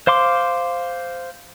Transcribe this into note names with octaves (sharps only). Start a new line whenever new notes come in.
C5 F5 C6 D6